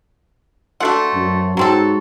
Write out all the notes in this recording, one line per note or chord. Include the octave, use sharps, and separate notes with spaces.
A3 D4 F#4 A4 C5 F#5
F#2
G#2 F#3 C4 F#4 A4 A#5